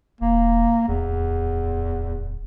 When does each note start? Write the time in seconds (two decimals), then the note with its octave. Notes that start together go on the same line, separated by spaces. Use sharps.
0.21 E1 A#3
0.88 D1 E2